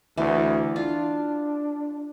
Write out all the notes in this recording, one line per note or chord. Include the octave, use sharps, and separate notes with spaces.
D2 E3
D4 F4